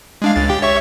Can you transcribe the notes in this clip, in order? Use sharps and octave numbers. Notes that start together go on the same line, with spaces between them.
G#3 D4 F5
C#2 A6
G4 G5
C#5 E5 C#6